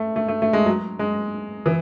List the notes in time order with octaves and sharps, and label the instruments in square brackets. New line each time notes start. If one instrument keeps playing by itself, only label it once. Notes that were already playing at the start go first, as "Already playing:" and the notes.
Already playing: [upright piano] A3
A3
A3
A3
G#3
F#3
G#3
E3